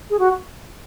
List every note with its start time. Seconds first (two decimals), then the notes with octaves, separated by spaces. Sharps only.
0.10 G#4
0.19 F#4